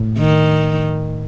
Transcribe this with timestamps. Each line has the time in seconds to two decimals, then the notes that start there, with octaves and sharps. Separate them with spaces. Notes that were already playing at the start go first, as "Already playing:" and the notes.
Already playing: A2
0.18 D#3